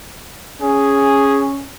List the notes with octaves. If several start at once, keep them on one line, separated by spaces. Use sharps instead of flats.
C#4 G#4